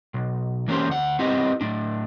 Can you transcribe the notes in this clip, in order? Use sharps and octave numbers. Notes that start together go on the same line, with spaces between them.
B1
E3 A#3 C#4 G4 C5
D2 F#5
B3 C4 E4 G4 D#5
A2 D4